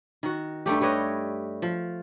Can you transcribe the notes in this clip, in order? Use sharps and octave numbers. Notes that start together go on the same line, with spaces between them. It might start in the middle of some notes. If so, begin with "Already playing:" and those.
D#3 F#4
G2 G3 A3 G4
G4 B4 C#5 D#5
F3